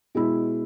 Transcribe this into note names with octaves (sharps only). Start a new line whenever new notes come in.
B2 G#3 E4